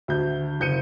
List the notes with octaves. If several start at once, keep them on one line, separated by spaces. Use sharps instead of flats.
D2 G6
F#1 G6 C#7 D#7